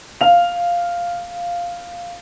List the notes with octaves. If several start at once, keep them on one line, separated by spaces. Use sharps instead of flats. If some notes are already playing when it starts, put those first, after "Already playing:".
F5 F7